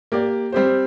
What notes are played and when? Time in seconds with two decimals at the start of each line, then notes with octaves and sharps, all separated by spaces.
0.12 A#3 G4 D5
0.52 G3 C4 G4 C5